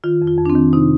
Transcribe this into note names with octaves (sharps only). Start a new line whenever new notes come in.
D#3 F4
F2
F4
F2
D4
C4
D#3
C3 D#4